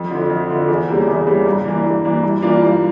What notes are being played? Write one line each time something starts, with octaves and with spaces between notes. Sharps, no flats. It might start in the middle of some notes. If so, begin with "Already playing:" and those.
Already playing: F2
D3 F3
F2
D3 F3
E2
C#3 G3 A#3
E2
C#3 G3 A#3
G2
E3 A#3 D4
G2
E3 A#3 D4
G2
E3 A#3 D4 F4
G2